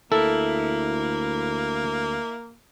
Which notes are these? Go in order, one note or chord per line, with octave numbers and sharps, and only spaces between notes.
D2 A#3 E4 A4